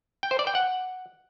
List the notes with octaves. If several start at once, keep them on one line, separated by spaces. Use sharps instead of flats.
G5
C5
D5
G5
F#5